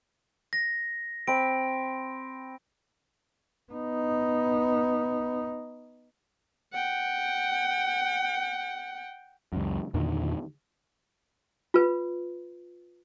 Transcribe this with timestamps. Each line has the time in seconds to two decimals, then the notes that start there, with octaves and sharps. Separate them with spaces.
0.53 A#6
1.27 C4 B5 D7
3.72 B3 D#4
6.73 F#5 G5
9.53 C#2 F#2
9.94 E2 A#2 D3 D#3
11.74 F4 B4